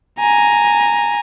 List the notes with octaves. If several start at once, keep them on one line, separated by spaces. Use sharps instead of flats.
G#5 A#5